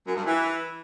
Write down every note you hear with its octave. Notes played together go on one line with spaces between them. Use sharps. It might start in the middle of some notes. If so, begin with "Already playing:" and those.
F#2
G2
E3